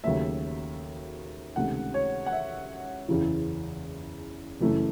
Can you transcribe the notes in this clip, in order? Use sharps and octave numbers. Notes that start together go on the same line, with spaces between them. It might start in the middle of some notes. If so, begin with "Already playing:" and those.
D#2 C#3 F#3 A3 E5
C#2 C3 D#3 A3 F#5
C#5
F#5
E5
F#1 E2 C#3 E3
F#1 F#2 E3 A3